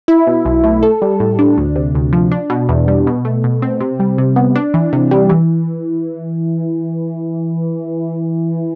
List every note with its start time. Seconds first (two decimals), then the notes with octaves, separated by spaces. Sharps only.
0.08 E4
0.27 B2
0.45 B1
0.64 A3
0.83 A4
1.02 G3
1.20 A2
1.39 D4
1.58 D2
1.76 C3
1.95 D2
2.13 F3
2.32 D4
2.50 B2
2.69 E2
2.88 G3
3.07 B2
3.25 A3
3.44 B2
3.62 C4
3.80 C3
4.00 G3
4.18 C3
4.36 B3
4.55 D4
4.74 E3
4.93 C3
5.11 G3
5.29 E3